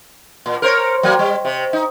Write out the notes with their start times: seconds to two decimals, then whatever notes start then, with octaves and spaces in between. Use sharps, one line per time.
0.46 A#2
0.62 A#4 C5 C#5
1.03 F#3 A#3
1.19 G3
1.45 C3
1.73 D#4